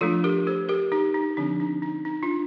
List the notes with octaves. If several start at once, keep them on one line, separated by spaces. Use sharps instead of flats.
F3 A3 D4 F4 A4
G4 A#4
A4 C5
G4 A#4
D#4 G4
D#4
D3 F3 C4 D4
D#4
D#4
D#4
D4 F4